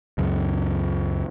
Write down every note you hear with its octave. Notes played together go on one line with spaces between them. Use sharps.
C#2 F#2